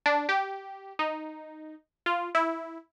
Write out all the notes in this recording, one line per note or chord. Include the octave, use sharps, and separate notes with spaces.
D4
G4
D#4
F4
E4